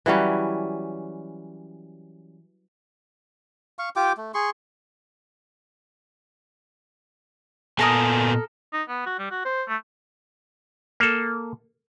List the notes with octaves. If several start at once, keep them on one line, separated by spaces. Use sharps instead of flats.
E3 F#3 G3 C#4
F5 C#6
F4 G4 G5 D6
A3
G#4 C6 C#6
A#2 B3 A4 A#4 G#5 D#6
D#4
B3
F#4
G3
F#4
C5
A3
A#3 A4